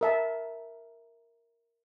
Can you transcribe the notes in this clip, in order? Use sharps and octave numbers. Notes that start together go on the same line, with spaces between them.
A#4 E5 A5